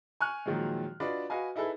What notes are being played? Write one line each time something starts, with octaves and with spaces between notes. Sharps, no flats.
G#5 C#6 F6 F#6
A#2 D#3 F3 F#3 G#3
D4 F4 F#4 B4 D5 D#5
F#4 B4 D#5 F5 G#5
D#4 E4 G#4 A4 B4